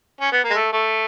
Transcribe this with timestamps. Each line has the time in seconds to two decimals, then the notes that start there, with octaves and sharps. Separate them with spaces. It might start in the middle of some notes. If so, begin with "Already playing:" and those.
0.21 C#4
0.32 B3
0.43 A#3
0.50 G#3
0.55 A3
0.72 A3